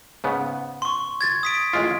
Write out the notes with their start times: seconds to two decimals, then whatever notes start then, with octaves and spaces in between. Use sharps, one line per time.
0.24 G#2 C#3 B3
0.82 C6 C#6
1.21 G#6 A6
1.43 D#6 B6 D7
1.73 A1 G#3 F4